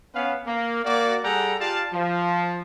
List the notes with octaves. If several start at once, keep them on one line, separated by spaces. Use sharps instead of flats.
B3 C#4 B4 F5
A#3
A#3 F#4 D5
G3 G#4 A4 F#5 G5 A#5
F4 G4 D5 F5 A5
F3